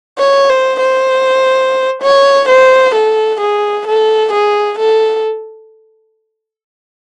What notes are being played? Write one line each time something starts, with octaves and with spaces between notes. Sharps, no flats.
C#5
C5
C5
C#5
C5
A4
G#4
A4
G#4
A4